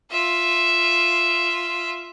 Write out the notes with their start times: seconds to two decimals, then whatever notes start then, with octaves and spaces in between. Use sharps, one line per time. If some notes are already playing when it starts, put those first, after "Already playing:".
0.11 F4 E5